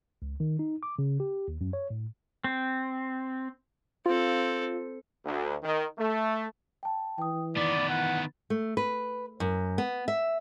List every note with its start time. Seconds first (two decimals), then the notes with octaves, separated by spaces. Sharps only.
0.22 C#2
0.40 D#3
0.59 D#4
0.83 D6
0.99 C#3
1.20 G4
1.48 D#2
1.61 F#2
1.73 C#5
1.90 A2
2.44 C4
4.06 C4 F4 A4
5.25 D2
5.63 D#3
5.98 A3
6.83 G5 A5
7.18 E3 G5 D#6
7.57 D#3 B3 D5 A6
7.90 E3 F#5
8.50 A3
8.77 B4
9.40 F#2
9.78 B3
10.08 E5